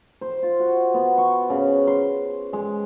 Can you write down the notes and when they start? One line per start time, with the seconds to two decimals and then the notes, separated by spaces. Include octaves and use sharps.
0.21 C5
0.43 F4
0.60 F#4
0.94 B3
1.18 C#6
1.50 C#3
1.87 C6
2.53 G#3